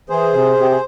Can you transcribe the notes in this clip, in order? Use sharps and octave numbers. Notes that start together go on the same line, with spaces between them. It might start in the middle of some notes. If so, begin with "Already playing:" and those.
E3 G#4 C5
C3
C3 G4
G#4